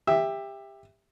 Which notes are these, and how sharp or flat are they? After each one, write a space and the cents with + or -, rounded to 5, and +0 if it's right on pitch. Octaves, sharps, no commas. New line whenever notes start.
G4 +20 E5 +0